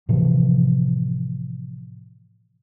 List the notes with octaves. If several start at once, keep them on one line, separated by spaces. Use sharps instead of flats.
A2 C3 E3 F3